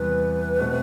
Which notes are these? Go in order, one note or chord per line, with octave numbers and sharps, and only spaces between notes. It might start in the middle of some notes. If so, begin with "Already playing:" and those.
Already playing: E2 C3 E3 G3 B4
B2 A3 C4